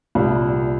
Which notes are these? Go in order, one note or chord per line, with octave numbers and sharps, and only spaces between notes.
C2 A#2 G3